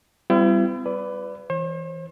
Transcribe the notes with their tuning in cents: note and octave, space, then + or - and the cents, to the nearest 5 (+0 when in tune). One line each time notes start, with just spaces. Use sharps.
G3 +0 C4 -45 E4 +45
B4 +15 D5 -10
E3 +0 C5 +45